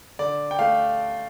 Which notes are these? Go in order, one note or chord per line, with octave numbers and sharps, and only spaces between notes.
D3 D5
G5
A3 F5